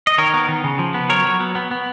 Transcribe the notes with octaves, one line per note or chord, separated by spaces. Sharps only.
D#5
D#3 A#4 C#5
B3
D#3
C#3
F3
B3
F#3 A#4 C#5
F#3
B3
B3
B3